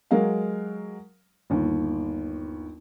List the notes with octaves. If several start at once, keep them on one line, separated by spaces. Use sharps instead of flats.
F#3 G#3 A#4 F5
G1 D#2